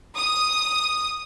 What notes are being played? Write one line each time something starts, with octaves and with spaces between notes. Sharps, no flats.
D#6